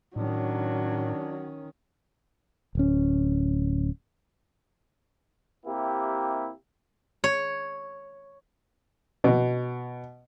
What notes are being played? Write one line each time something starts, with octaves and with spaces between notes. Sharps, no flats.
A2 D#3 F#3 C#4 D4
D1 C#4
C3 A#3 E4 G4
C#5
B2